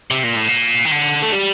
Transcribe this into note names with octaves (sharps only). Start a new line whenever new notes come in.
C3
A#2
A2
A#2
D#3
D3
A3
G3